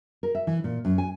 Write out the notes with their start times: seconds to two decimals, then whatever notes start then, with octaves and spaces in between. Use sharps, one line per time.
0.23 A#4
0.35 E5
0.47 E3
0.64 A#2
0.85 F#2
0.98 G#5